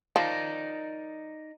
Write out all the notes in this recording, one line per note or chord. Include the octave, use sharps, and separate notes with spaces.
F3 D#4 A#4 D5